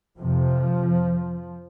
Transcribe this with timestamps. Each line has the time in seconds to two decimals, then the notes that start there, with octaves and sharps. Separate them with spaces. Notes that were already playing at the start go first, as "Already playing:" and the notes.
0.18 F2 C3 F3